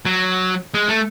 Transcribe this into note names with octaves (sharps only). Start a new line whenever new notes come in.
F#3
G#3
A3